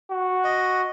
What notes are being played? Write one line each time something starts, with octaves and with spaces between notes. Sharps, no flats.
F#4
D#5